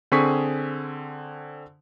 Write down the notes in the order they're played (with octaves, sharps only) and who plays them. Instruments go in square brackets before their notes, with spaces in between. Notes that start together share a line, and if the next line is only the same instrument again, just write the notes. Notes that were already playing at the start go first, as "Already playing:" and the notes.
[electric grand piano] D3 C4 G#4 G#5 C#6 B6